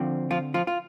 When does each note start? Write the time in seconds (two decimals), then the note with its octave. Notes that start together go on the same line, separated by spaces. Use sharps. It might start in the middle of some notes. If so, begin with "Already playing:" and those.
Already playing: D3 F3 C4
0.31 F3 F4
0.54 F3 F4
0.67 F4